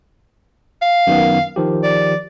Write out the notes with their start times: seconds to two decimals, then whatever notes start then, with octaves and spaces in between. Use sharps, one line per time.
0.82 F5
1.07 F#2 D#3 B3
1.56 D#3 F3 G4
1.83 D5